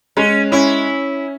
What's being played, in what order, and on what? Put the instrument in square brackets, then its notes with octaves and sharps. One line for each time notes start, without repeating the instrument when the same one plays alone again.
[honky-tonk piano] G#3 [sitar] C#4
[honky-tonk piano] C#4 [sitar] E4